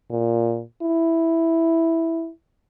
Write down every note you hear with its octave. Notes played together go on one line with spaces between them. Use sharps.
A#2
E4